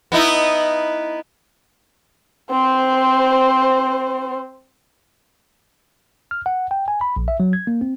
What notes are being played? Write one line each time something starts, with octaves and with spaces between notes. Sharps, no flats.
B3 D#4 E4
C4 C5
F6
F#5
G5
G#5
B5
A#1
E5
F#3
G#6
A#3
C4